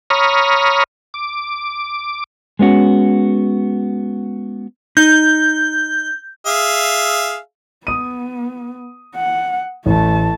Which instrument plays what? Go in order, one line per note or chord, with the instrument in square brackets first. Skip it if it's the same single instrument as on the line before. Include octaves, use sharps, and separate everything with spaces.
[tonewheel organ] C#5 A#5 B5 C#6 D#6 F6
D6
[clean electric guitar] G#3 B3 C#4 F#4
[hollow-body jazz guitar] D#4 [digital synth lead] G6
[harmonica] G#4 E5 F5
[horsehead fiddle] B3 [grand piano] D#6 D#7
[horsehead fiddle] F#5
[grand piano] A1 [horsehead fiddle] A3 A5